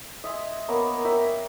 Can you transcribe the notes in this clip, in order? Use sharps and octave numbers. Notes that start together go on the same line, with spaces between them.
D#5 E5 G#5 C6
A#3 B3 A#4 C#5
A#4 C#5 E5 G5